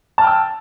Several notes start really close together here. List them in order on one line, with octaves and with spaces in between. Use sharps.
A5 F6 G5 E6